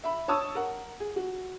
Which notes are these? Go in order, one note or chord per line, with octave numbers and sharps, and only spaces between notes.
E5 B5
C#5 A5 C#6 D#6 E6
A#4 F#5
G#4
F#4